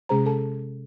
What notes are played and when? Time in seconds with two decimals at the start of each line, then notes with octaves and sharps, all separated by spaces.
0.09 C3 G#3 C#4 G#4 C5 A#5
0.26 A4 A5